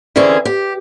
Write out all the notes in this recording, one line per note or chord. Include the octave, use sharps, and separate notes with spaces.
D3 E3 C4 C#4 G#4
G4